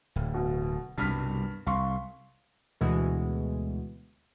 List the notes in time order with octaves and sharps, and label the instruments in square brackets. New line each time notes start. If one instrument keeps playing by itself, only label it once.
[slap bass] D1
[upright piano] B2
[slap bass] C2 B2 [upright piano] G2 F6 B6
[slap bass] C2 [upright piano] F5 C6 C#6
[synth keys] D2 B2 E3 G#3